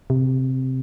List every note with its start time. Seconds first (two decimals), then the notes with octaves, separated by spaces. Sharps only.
0.10 C3